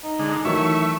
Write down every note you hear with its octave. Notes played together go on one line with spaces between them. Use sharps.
D#4
D3 G#3
D#3 E3 F#3 A3 E5 C#6